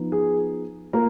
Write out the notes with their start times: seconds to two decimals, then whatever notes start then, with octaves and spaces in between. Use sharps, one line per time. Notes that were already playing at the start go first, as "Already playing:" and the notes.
Already playing: F3 B3 D#4
0.12 G#4
0.93 A#3 F4 A#4